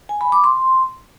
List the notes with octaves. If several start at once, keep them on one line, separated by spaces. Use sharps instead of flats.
G#5
B5
D6
C6